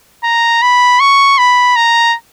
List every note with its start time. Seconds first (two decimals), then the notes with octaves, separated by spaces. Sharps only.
0.24 A#5
0.62 B5
1.00 C#6
1.38 B5
1.76 A#5